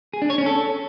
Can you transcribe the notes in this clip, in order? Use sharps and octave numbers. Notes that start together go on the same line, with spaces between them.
G#4
D4
C#5
C#4
A4